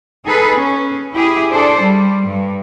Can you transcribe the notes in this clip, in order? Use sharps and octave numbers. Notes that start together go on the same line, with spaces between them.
D#4 G#4 A4 B4
C#4
E4 G4 G#4
D4 A4 C5 D5
G3
G2